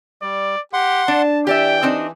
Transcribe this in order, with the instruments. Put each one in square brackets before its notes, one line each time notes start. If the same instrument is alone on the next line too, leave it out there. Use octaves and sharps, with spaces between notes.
[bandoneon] G3 [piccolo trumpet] D5
[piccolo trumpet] G4 [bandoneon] F#5 C6
[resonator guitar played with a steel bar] D4 [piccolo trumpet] A5
[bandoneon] E3 [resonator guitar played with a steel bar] G4 D5 E5 [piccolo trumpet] G5
[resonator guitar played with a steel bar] C4 D4 D#4